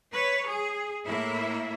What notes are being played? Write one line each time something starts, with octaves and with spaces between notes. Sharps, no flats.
B4 C#5
G#4
A2 A#3 E4 E5